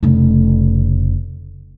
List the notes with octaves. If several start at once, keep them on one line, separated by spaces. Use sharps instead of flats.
F1 C#3